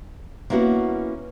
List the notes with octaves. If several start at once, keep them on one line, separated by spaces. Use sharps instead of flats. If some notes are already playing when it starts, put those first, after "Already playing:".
A#3 B3 C#4 E4 F#4